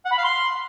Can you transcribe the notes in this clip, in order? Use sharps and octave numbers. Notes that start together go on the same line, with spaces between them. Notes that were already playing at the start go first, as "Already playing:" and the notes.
F#5
B5
F5
C6